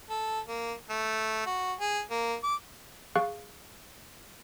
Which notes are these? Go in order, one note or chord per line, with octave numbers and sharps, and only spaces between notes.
A4
A#3
A3
F#4
G#4
A#3
D6
G#4 F5 C#6 F#6